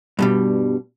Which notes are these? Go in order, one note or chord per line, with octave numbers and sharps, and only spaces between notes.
G2 B2 G3